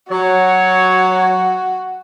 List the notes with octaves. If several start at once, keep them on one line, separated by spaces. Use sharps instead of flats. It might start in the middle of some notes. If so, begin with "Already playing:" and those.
F#3 F#4 C#5